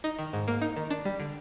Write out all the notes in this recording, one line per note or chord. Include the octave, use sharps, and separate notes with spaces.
D#4
D#3
G#2
A#3
D#4
D#3
D4
G3
D3